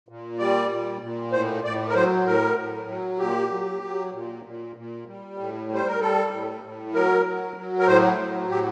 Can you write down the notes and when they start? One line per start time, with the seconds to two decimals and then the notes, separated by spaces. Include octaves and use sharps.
0.09 A#2
0.39 G3 D5
0.71 A#2
1.01 A#2
1.32 A2 C5
1.64 A2 D5
1.89 A#4
1.94 F#3 C5
2.26 A2 A#4
2.58 A2
2.88 F#3
3.19 A#2 G4
3.51 F#3
3.82 F#3
4.13 A#2
4.45 A#2
4.76 A#2
5.07 G3
5.38 A2
5.69 G3
5.75 C5
5.87 A#4
6.00 G3 A4
6.31 A2
6.63 A2
6.93 F#3 A#4
7.24 F#3
7.56 F#3
7.79 A#4
7.87 A2 C5
8.18 F#3
8.49 A2 G4